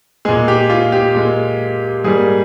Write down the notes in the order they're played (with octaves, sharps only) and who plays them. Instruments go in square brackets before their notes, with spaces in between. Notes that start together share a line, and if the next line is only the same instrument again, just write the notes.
[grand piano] A#2 G#3 G#4
G4
F4
G4
A#2 G#3
G#2 G3 A#3 G#4